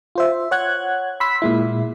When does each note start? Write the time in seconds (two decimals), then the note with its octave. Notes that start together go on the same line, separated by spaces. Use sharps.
0.15 F4 C5 E5
0.51 C#5 F#5 F#6 G#6
1.20 B5 C6 E6 B6
1.42 A#2 G#3 E4